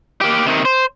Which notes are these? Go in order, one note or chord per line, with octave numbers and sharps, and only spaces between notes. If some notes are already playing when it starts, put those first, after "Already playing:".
A#3 G4
C3 D#3
C5